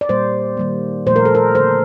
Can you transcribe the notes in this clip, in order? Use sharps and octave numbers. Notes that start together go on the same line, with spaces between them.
D5
A#2 G3 A#3 C5
D#3 G3 A#3
A#2 F3 A3 C5
A#4
A4
A#4
D3 A3 C5